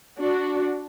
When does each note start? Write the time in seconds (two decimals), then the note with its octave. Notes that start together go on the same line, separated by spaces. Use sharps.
0.19 D4 F#4